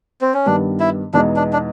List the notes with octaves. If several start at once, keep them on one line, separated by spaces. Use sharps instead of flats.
C4
C#4
G2 D#3 G3 B3 D4
E4
E2 B2 G#3 B3 D4 D#4
D4
D4